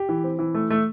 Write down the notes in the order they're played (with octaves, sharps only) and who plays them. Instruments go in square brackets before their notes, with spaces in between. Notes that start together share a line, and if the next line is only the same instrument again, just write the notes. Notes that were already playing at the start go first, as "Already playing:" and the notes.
Already playing: [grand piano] G4
E3
C4
E3
A3
A3